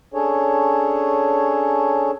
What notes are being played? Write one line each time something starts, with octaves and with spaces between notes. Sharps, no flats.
C#4 D4 G#4 A4 C#5